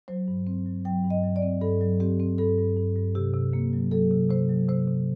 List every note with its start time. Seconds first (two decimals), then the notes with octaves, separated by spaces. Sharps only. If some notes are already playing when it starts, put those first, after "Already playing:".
0.08 F#3 C5
0.28 G2
0.47 C4
0.66 F#3
0.85 F#3 G5
1.04 G2
1.10 D#5
1.24 F#3
1.36 D5
1.42 C4
1.61 G2 A4
1.81 F#3
2.00 C4 G4
2.20 C4
2.38 G2 A4
2.58 G2
2.77 G2
2.96 G2
3.15 C3 G4
3.34 C3
3.53 A#3
3.73 F#3
3.91 F#3 A4
4.11 C3
4.30 C3 C5
4.49 F#3
4.68 C3 C5
4.88 C3